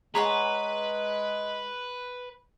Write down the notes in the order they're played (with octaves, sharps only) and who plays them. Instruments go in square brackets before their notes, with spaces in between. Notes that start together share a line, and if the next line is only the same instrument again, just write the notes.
[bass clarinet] G#3 [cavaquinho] G#4 C#5 F#5 [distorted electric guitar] B4 [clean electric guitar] A#5 C6